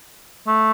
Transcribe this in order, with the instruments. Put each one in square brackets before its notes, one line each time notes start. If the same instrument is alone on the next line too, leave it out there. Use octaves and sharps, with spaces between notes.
[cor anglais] A3